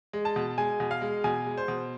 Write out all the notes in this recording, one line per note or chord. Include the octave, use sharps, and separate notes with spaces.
G#3
A5
B2
G#3 G#5
B2
F5
G#3
B2 G#5
G#3
C5
B2